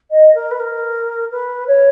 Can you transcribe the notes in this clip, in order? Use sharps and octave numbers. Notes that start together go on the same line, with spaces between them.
D#5
A#4
B4
A#4
B4
C#5